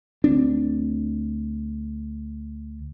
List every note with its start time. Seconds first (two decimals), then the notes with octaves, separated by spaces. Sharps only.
0.24 D2 C4 D4